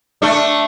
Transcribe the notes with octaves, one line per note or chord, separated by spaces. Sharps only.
A3 D4